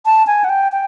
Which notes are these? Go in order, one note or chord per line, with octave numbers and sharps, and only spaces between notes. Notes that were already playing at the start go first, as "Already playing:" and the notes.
A5
G#5
F#5
G5
G5